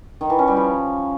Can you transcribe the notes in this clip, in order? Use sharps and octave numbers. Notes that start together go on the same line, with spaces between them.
D#3
E3
C#4
G3
F3